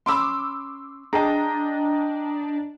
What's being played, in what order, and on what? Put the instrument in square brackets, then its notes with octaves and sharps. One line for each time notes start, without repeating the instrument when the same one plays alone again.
[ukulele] C#4 B5 [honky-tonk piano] C6 D6 E6
[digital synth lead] D4 [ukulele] G#4 A5 [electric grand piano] D#5 G5 A#5